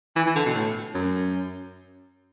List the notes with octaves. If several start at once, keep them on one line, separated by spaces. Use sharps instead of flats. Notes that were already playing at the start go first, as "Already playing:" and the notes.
E3
E3
D3
B2
A2
F#2